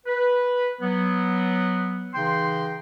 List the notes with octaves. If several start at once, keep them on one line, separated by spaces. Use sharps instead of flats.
B4
F#3 B3
C#3 E3 D#4 G5 C6